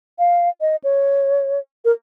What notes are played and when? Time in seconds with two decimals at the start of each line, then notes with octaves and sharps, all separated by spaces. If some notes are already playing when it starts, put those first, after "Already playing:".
0.19 F5
0.61 D#5
0.84 C#5
1.85 A#4